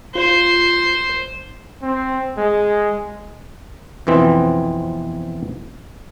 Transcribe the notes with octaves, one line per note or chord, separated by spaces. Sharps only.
F4 C5
C4
G#3
F2 B2 E3 C4